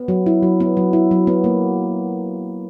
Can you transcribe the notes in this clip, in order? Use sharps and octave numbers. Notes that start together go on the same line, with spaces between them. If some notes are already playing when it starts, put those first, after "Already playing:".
Already playing: B3
F#3
E4
F#3
B3
F#3
E4
F#3
B3
A#3